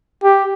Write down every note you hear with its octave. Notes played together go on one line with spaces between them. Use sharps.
G4